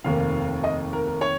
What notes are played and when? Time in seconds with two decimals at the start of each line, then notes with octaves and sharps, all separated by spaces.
0.04 F1 D#2 D#3 A#3 F5
0.64 D#5
0.93 A#4
1.07 A#4
1.21 C#5